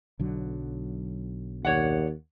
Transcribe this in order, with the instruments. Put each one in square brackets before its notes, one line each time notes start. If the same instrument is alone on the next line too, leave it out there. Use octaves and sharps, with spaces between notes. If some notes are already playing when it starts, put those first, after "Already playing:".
[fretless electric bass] B1 D3 F#3
[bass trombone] D#2 [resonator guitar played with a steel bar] C#5 D5 F#5